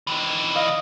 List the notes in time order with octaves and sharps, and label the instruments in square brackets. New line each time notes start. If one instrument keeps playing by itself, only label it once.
[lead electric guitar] D#3 E3
[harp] D#5 F5